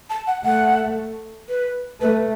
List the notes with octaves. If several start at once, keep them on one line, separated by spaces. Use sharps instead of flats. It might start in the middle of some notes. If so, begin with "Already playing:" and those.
A5
F#5
A3 F#5
B4
A3 B4